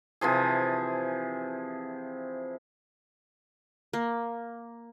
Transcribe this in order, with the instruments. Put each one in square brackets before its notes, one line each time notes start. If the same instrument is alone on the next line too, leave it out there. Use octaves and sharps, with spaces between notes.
[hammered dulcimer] C3 E3 F3 G#4
[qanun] A#3